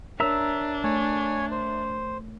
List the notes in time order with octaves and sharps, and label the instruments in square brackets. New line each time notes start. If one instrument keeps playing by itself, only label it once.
[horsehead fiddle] D4 [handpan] A#4 C#5 [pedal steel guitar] E5 A#5 E6
[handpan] A3 [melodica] C#5 G#5
[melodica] C5